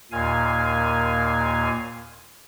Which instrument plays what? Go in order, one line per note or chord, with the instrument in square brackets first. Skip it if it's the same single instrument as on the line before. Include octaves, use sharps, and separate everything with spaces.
[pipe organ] D#2 A#2 F5 G#5